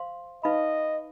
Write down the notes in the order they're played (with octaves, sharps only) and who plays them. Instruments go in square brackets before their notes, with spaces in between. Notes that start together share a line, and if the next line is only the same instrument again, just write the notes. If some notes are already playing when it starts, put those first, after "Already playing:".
Already playing: [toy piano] C5 F5 C6
[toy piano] D#4 B4 F5 B5 [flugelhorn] D#5